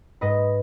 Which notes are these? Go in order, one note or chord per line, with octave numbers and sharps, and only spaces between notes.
G#2 B4 D#5